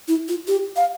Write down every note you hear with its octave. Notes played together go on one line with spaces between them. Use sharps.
E4
F4
G4
F5